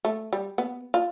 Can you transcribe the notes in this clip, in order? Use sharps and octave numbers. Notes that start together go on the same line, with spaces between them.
A3
G3
B3
F4